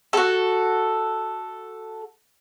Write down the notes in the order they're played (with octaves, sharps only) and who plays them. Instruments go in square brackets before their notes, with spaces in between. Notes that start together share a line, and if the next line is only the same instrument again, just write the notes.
[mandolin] F#4 A4